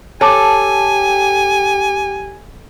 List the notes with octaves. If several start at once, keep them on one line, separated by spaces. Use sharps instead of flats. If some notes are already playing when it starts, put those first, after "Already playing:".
G4 A4 C#5 G#5 A5 D6